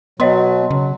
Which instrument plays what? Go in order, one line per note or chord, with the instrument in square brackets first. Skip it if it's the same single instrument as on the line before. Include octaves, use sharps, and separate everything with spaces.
[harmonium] B2 F#3 [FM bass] B3 [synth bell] C#5 D#5 C6
[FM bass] C#3 [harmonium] F#3